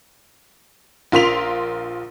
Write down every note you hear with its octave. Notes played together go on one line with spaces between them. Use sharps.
A#1 F4 A#4 C6 B6 F7